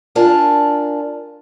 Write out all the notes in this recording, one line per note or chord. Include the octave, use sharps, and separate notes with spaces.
D4 F4 A#4 D5 G#5 A5